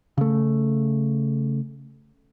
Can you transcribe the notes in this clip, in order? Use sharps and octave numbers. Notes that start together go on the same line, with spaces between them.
C#3 A3